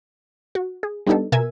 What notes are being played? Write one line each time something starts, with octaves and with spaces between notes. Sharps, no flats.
F#4
G#4
G3 B3 D4 D#4 G4 A4
B2 A#4 E5 G#5 E6 G#6